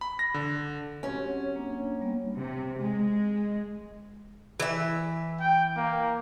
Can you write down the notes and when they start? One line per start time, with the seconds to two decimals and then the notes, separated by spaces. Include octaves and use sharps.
0.01 B5
0.19 A#6
0.34 D3
1.03 F#2 C4 C#4 G4
1.56 A#3 D4
2.01 G3 A#3 B3
2.37 C3
2.79 G#3
4.60 E3 E5
5.40 G5
5.77 A#3